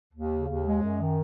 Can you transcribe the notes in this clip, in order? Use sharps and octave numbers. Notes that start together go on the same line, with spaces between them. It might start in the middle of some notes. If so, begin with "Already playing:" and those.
D#2
C#3
D#2
G#3
F#2
D#3